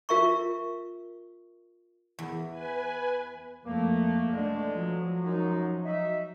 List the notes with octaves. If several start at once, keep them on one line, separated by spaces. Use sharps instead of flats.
F4 A#4 E5 A#5 C#6
E2
B4 G#5
F2 A3 A#3
D3 E3 G#3 A3 D4
F3 F#3
F#2 G#3 D#4
D#4 F#4 E5